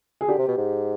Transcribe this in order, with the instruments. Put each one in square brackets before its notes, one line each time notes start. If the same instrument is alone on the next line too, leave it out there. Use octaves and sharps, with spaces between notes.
[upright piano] G#4
[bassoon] D3 [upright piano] G4
[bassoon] C3
B2
G#2